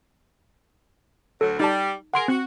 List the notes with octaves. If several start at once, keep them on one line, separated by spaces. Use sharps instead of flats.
D2 F#3 A4
G3 D#4 A5
G#4 A#4 F#5 C6 D7
C4 F#4